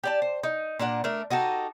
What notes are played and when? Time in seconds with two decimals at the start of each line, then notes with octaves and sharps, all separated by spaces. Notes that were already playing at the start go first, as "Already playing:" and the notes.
0.04 G4 D5 A5
0.22 C5
0.43 D#4
0.79 A#2 D4 A#4 F#5
1.04 A3 D4 A#4
1.30 D#4 F#4 G4 A4